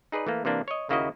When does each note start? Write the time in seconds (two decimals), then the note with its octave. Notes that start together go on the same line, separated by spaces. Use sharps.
0.12 D#4 G#4 B4 D5
0.27 E3 A3 A#3
0.45 C3 E3 A#3 D4
0.68 C#5 D#5
0.89 D#2 C#3 A#3 E4 F#4 D#5